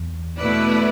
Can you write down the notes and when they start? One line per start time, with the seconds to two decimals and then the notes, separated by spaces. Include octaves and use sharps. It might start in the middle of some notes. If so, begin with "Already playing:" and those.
Already playing: E2
0.37 B2 A3 E4 B4 D5